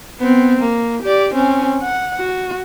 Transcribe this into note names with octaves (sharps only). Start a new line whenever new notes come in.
B3 C4
A#3
G4 D5
C4 C#4
F#5
F#4